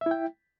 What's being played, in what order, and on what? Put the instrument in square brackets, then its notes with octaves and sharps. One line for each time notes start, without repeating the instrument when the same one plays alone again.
[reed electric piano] E5
E4
G5